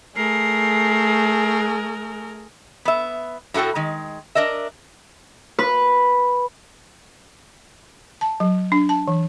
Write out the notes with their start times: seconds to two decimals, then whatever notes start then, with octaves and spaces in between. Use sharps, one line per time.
0.16 A3 G#4 A#4 C7
2.85 B3 E5
3.54 A2 A3 F#4 A4 G5
3.75 D#3 G#3
4.35 D4 A#4 D#5 E5
5.59 B4
8.21 A5
8.40 F#3
8.72 D4
8.89 A5
9.08 E3